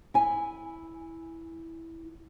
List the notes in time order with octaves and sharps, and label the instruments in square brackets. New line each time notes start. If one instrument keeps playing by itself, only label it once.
[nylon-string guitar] E4 G#5